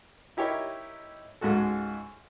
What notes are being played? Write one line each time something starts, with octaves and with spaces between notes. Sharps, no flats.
D#4 E4 G4 A#4 C#5
C#2 G#2 G#3 F#4 A4